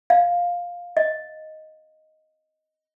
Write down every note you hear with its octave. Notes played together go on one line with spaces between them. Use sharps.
F5
D#5